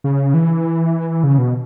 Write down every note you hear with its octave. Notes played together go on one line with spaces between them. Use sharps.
C#3
E3
C#3
B2